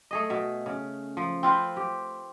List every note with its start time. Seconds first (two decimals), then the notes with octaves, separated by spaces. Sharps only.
0.11 A3 G#4 D#5
0.30 B2 E5
0.66 C#3
1.17 F3
1.43 C4 F4 B4 C5
1.77 G4